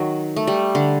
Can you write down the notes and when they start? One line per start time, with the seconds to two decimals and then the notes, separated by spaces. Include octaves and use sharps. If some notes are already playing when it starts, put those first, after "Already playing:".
Already playing: D#3 F#3
0.36 A3
0.47 G3
0.75 D3